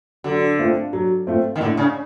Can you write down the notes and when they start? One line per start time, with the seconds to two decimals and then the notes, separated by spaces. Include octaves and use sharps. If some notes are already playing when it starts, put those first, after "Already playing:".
0.24 D3 F#3
0.59 A3 C4 F4
0.93 F#3
1.27 A3 C4 F4
1.55 D#3
1.60 A2 D3
1.77 C#3